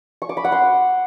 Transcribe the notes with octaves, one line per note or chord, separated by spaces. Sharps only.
C#6
D6
B5
F#5
C6